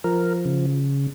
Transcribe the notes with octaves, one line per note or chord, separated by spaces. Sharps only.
F3 A#4
C#3